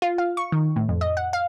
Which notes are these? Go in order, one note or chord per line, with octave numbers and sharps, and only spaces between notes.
F4
F5
C#6
D#3
A2
F2
D#5
F#5
F5